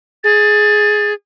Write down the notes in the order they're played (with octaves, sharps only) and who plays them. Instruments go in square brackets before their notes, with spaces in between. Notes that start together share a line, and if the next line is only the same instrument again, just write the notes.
[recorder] G#4 [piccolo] A6